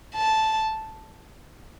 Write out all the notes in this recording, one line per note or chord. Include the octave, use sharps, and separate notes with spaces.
A5